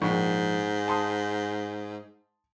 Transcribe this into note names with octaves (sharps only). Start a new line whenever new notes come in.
A#1 G#2 C#6
A5 C6 D#6